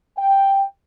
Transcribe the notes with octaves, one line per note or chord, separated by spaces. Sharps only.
G5